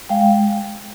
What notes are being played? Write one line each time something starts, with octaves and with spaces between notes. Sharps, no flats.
G#3 F5 G5